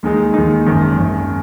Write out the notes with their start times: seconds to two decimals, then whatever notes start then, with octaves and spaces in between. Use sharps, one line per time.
0.03 D#2 D#3 G#3 D#4
0.34 D#2 D#3 G#3 D#4
0.66 G#1 F#2 D#3
0.97 G#1 F#2 D#3